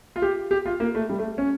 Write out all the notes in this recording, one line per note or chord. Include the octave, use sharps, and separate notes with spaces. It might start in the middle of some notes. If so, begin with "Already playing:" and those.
F4
G4
G4
F4
A#3
A3
G3
A3
C#4